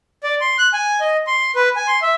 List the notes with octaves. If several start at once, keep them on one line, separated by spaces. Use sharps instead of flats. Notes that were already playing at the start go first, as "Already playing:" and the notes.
D5
C6
F#6
G#5
D#5
C6
B4
G#5
C6
E5